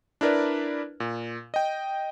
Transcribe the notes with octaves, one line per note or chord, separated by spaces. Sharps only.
D4 E4 A#4 B4 D5
A#2
D#5 G5